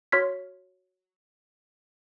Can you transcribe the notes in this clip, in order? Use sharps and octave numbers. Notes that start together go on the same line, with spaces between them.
F#4 C#5 C6 F6 G#6 B6